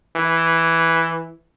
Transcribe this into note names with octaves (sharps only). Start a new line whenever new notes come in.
E3